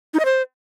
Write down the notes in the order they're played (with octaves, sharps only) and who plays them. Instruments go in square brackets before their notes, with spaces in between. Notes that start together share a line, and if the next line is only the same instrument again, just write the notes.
[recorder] D#4
D#5
C5